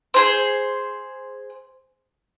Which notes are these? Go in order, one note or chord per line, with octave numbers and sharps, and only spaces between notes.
G#4 C5